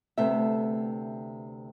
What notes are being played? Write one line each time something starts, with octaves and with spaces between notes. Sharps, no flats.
D2 C3 A3 B3 E5